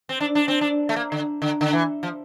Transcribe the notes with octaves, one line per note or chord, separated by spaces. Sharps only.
C4
D4
D4
C4
D4
A3
A#3
D3
D3
D3
E3
F3